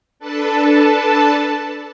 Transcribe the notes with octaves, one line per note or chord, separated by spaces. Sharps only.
D4 A4 B4 A5